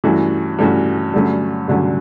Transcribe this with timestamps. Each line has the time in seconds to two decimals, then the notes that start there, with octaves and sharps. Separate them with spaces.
0.04 G2 E3 A3 C#4 F#4
0.59 G2 E3 A3 C#4 F#4
1.14 G2 D3 F#3 A3 C#4
1.68 G2 D3 F#3 A3 C#4